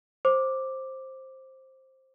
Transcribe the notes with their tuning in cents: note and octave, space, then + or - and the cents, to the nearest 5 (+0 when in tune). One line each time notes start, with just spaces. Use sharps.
C5 +10 D6 +0